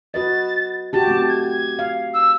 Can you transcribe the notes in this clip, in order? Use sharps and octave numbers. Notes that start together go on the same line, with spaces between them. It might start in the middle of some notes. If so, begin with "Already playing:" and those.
F#4 B4 D#5 A6
F#4 G4 A5
A3 C4
G#6
F5
E6